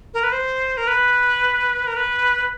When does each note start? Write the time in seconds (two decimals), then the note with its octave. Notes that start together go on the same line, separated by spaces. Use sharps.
0.14 A#4
0.23 B4
0.32 C5
0.77 A#4
0.87 B4
1.87 A#4
1.96 B4